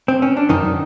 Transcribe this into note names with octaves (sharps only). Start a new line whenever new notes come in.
C4
C#4
D4
F#2 D#3 D#4